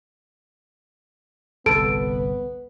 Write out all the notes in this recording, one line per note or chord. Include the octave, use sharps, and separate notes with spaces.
G1 C2 B3 A4 D7